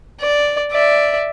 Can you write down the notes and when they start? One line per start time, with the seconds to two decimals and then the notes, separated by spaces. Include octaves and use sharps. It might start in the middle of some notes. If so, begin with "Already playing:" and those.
0.21 D5
0.72 D5 E5